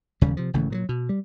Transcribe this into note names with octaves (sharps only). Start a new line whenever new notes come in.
E1 D#2 C#3 G3
C3 F3
G#1 C#3 E3 A3
A#2 F3 F#3
B2
G3